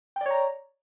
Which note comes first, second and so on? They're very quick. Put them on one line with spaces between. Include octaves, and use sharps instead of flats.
G5 D5 C#5 A#5